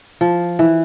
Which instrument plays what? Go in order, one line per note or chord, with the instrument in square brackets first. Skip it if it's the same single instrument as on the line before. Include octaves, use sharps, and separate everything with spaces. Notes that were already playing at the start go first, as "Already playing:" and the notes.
[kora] F3
E3